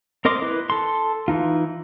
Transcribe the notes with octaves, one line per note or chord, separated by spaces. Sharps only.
C4 A#4 D#5 C6 D6
E4 B4
A4 C6
E3 D#4 F4